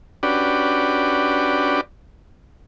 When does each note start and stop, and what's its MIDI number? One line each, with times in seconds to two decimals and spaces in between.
0.23 1.81 61
0.23 1.81 62
0.23 1.81 66
0.23 1.81 67
0.23 1.81 71
0.23 1.81 74